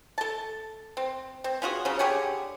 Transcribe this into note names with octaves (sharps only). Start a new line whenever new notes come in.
A4 A5
C4
C4
C#4 F4 F#4 G#4
C#3 F#3 C#4
D3 G4 G#4 C#5